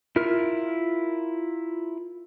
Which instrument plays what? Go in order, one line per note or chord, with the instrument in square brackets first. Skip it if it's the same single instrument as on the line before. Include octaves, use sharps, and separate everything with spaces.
[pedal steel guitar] E4 F4 A#4 F6